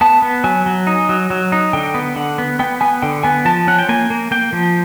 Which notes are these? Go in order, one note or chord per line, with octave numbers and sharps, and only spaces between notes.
B3 A5
B3
F#3 G#5
F#3
D#4
F#3
F#3
D#4
D3 G5
B3
D3 F#5
B3
B3 G5
B3 G#5
D3 G5
B3 G#5
F3 A5
C#4 F#5
G5
A#3 G#5
A#3
A#3 G5
F3